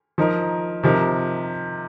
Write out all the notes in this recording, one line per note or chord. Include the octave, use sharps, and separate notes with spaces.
F3 D#4 A#4
C3 F3 D#4 A#4